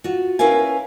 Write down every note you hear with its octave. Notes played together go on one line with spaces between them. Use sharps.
F4 F#4
C#4 E4 A#4 B4 F5 G#5